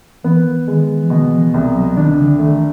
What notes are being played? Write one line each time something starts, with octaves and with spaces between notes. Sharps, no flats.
E3 B3
D#3 G#3
E3
B2 D#3
E3
C2
F#3
D#3 D4
D3
D#3 A3
D#3